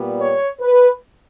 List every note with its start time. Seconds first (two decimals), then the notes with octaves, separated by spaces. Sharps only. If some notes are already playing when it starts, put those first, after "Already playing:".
Already playing: A#2 G3 B3
0.20 C#5
0.61 B4